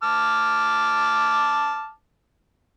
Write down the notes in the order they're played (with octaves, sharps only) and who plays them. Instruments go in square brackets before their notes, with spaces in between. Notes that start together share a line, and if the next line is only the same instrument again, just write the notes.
[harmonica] A5 D6 F6